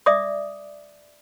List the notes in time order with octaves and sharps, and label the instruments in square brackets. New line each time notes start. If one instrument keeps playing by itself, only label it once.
[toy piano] D5 E5 D6 D#6